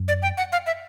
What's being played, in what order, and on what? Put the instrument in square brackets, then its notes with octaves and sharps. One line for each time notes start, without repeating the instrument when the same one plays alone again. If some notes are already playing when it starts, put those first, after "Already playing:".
Already playing: [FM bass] F#2
[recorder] D5
G5
F#5
F5
E5